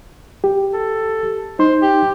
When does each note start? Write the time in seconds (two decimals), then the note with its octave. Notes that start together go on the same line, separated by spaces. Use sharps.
0.44 G4
0.73 A4
1.59 D#4 C5 C6
1.82 G4